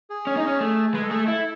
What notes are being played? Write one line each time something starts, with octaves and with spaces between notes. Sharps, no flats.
G#4
C#4
D#4
C#4
A3
G#3 B4
A4
A3 G#4
A4
E4 A4